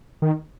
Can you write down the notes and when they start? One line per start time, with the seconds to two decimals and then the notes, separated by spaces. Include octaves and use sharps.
0.22 D#3